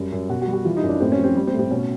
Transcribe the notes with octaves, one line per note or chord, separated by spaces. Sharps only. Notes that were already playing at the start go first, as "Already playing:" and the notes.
Already playing: F#2 G3
F#2
B2 F#4
F#4
G3
F#4
E3 F4
D#4
F#2
D4
A2 C4
C#4
F3
C4
G3
C4
A2
C4
B2 C#4